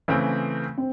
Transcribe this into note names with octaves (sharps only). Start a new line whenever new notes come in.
C#3 E3 A3 C4
C4